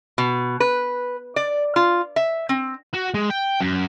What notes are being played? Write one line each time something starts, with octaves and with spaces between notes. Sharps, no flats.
B2
B4
D5
F4
E5
C4
F#4
G#3
G5
F#2